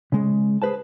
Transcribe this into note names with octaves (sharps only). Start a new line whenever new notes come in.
C#3 G#3
G#4 B4 C5 A5